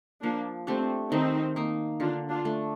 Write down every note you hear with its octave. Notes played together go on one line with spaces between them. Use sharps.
F3 A#3 D4
A3 C4 D4 G4
D#3 C4 D#4
A#3 D#4
D3 D4 F4
D4 F4
A3 D4